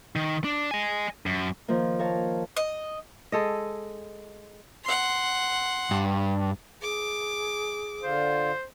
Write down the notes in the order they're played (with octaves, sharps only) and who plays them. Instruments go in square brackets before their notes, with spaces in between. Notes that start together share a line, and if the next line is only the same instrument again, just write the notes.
[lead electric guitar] D#3
D4
D#5 G#5
F#2
[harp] D#3 F3 A#3
A#4 C#5 F5 A5
[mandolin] D#5
[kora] G#3 A4 D#5
[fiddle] F#5 C6
[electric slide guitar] G2
[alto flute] G#4 [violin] D6
[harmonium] D3 F4 [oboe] C5